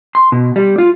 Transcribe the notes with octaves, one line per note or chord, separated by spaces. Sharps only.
C6
B2
G3
F4